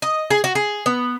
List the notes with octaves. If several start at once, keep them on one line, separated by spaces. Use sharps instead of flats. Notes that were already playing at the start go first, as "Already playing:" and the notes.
D#5
G#4
F#4
G#4
B3